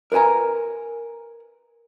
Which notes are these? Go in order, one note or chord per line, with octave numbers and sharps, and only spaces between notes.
A#4 B4 D#5 G#5 A#5